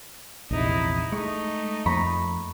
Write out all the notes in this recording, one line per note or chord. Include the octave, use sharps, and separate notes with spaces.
A#1 E2 C3 D#4 E4
G#3 A3 D#4 C#6
F2 F3 A#3 A#5 B5 C#6